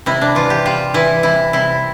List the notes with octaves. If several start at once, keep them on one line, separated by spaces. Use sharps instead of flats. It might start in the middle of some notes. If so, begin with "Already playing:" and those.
C3 E4
D4
E3 F4
G4
G3 F4
E3 E4
C3 E4
C3 E4